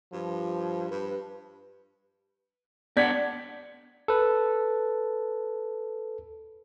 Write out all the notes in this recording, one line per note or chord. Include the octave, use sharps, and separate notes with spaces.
G2 F3
G2 B4
B3 D4 D5 F#5 G#6 B6
A4 B4